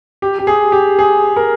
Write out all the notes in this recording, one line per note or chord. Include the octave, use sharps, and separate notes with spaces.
G4
G4
G#4
G4
G#4
A#4